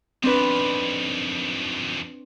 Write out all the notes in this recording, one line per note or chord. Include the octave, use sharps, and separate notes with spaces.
F2 D#3 C4 D4 B4